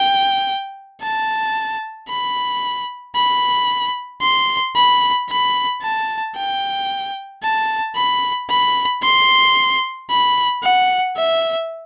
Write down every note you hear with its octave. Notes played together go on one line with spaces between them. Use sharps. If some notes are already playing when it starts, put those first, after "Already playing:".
Already playing: G5
A5
B5
B5
C6
B5
B5
A5
G5
A5
B5
B5
C6
B5
F#5
E5